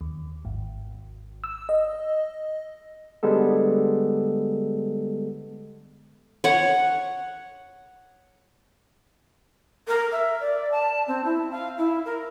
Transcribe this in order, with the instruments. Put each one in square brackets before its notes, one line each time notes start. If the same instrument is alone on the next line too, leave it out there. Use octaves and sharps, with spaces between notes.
[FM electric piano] D#2
G#1
E6
D#5
[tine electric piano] D3 G3 G#3 B3 A4
[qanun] C#5 F#5
[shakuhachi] A#4
E5
D5
A5
C4
E4
F5
E4
A#4